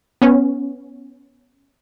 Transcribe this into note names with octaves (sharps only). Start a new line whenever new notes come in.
B3 C#4